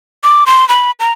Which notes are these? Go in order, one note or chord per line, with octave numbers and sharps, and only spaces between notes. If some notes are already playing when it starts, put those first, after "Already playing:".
D6
C6
B5
A#5